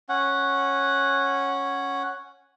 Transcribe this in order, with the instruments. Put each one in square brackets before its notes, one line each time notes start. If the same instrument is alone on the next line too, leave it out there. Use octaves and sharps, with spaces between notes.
[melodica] C#4 F#5